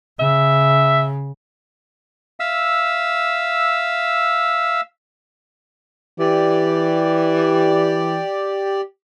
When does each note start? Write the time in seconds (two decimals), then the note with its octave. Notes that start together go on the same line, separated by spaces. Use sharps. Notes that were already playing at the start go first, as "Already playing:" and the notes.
0.19 C#3 E5
2.40 E5 F5 E6
6.18 E3 G4 D5